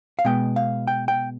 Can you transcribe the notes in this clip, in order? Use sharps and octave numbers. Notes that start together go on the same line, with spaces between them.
F5
B2 G#3 B3 G5
F5
G5
G5